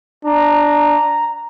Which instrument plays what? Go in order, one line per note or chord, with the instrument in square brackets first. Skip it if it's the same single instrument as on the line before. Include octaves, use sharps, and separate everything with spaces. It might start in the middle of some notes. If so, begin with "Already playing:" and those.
[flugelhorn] D4 [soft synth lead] A#5